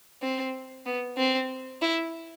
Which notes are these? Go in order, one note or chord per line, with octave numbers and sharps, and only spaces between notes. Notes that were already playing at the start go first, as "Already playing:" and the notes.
C4
B3
C4
E4